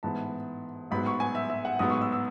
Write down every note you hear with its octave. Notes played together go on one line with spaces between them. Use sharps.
A1 G#2 E3 B3 A5
A1 G#2 F#3 B3 B5
C#6
G#5
E5
E5
F#5
A1 G#2 F#3 B3 D#6
C#6
E6
E6